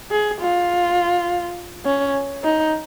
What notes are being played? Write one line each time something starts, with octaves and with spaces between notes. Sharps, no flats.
G#4
F4
C#4
D#4